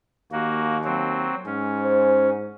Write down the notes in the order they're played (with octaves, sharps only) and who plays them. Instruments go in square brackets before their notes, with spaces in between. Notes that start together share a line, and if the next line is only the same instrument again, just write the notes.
[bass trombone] D#2 [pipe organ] A#3 F#4
[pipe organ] F#3 C4
[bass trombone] G#2 [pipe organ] C#4
[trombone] C5